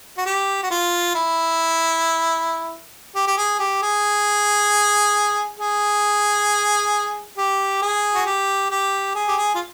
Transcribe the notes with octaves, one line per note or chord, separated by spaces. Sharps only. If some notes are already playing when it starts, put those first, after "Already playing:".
F#4
G4
F#4
F4
E4
G4
G4
G#4
G4
G#4
G#4
G4
G#4
F#4
G4
G4
G#4
G4
G#4
F4